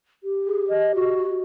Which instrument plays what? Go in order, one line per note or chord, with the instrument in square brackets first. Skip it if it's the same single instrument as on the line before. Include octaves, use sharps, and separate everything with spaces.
[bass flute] G4
[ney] G#4
D#5
F#4